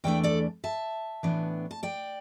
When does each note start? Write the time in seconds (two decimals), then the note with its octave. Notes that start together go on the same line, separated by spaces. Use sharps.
0.04 E2 E3 A3 D4 D5 G5
0.23 A4 D5
0.64 E5 A5
1.23 A2 E3 B3 D4
1.71 A5
1.83 D5 G5